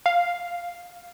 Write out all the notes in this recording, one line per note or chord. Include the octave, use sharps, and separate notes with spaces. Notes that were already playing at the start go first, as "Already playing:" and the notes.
F5